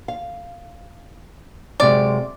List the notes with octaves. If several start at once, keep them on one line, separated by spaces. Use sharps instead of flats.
F5
F#2 C3 G#3 D5